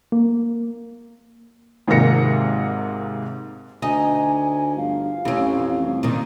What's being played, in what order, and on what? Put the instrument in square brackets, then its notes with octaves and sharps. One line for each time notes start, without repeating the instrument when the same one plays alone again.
[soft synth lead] A#3
[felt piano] G#1 G#2 C3 A#3 A#6 C#7
[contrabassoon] D2 [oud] D#4 [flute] G#5
[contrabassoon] G1 [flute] F5
[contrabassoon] A1 [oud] F2 C#4
[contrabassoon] C2
[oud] A#2 D#3